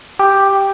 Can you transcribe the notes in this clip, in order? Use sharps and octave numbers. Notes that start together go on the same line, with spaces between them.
G4